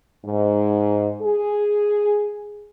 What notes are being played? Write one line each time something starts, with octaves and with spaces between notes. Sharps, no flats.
G#2
G#4